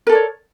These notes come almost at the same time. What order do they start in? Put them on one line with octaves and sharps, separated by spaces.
A#4 A4 D5 C#5